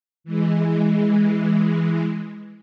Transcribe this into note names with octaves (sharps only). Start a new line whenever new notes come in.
E3 G#3